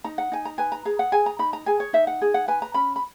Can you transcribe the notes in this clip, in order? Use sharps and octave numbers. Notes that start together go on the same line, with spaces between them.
D#4 A#5
F#5
D#4 G#5
A#5
B4 G#5
A#5
G#4 A#5
F#5
G#4 G#5
A#5
D#4 B5
A#5
G#4 G#5
C#5
D#4 E5
F#5
G#4
F#5
B4 G#5
A#5
C#4 B5
B5